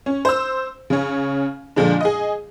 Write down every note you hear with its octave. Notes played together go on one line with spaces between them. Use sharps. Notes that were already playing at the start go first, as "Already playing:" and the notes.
C#4
C5 E6
C#3 C#4
A#2 D3 F3 G#3 D4
G#4 D#5